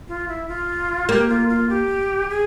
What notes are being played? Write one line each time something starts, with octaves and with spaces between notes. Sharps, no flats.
F4
E4
F4
A#3 G4
F4
F4
G4
G#4